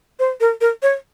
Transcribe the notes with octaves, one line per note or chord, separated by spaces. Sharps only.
C5
A#4
A#4
C#5